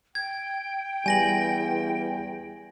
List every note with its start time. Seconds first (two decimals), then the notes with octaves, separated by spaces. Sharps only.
0.15 G5 G#6
1.06 E2 G3 B4 G#5 A#6 F#7